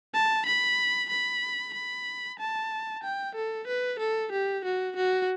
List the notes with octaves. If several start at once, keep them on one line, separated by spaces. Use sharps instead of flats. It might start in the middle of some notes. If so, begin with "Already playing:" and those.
A5
B5
B5
B5
A5
G5
A4
B4
A4
G4
F#4
F#4